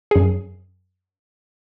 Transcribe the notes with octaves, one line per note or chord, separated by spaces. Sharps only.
F#2 G#4